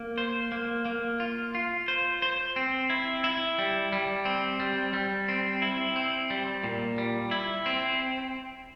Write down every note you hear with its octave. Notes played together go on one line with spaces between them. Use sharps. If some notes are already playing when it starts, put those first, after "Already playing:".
Already playing: A#3
C5
A#3
A#3
F4
F4
C5
C5
C4
E4
E4
G3
G3
C4
G3
G3
C4
E4
C4
G3
A#2
G3
E4
C4